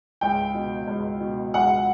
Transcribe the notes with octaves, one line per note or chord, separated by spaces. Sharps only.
C#2 G5
B2
C#2
B2
C#2 F#5